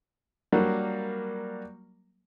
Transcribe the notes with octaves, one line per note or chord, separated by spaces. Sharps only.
F#3 G3 A#3 D4